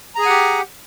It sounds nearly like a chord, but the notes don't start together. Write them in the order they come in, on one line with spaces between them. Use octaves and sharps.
A#5 G#4 G#5 F#5 G4